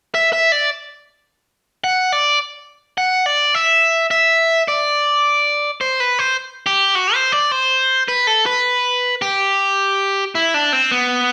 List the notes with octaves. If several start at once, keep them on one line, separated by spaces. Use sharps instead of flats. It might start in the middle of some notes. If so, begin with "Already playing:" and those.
E5
E5
D5
F#5
D5
F#5
D5
E5
E5
D5
C5
B4
C5
G4
F#4
C5
D5
C5
B4
A4
B4
G4
E4
D4
C4
B3